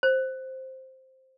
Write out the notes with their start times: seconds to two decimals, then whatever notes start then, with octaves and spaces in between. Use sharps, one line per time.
0.03 C5